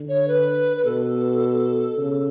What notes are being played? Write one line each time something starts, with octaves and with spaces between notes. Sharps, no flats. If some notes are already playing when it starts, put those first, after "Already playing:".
Already playing: D3
C#5
B4
B4
B2 A4
C#3